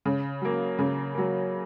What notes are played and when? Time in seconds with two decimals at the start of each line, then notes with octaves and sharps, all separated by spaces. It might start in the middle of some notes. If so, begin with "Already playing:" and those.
0.05 C#3
0.42 F#3 A#3
0.79 C#3
1.14 F#3 A#3